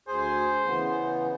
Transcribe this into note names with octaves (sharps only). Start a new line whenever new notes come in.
D2 G#4 C5 G#5
C#3 E3 B3